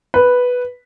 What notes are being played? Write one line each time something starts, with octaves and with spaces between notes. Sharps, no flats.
B4